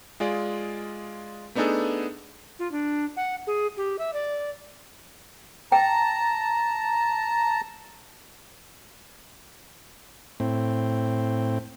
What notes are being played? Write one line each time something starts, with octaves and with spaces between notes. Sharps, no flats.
G#3 F4 G#4 D5
A3 B3 D4 D#4 G#4 A4
F4
D4
F#5
G#4
G4
E5
D5
G5 A5 A#5
A2 C4